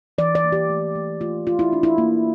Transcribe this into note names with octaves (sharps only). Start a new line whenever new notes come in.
E3 D5
D5
A#3
G4
A3
A3
A3 F4
E3 F4
E4
D4
E4
A#3